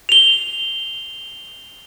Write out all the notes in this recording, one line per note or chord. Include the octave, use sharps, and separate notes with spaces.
F7 G7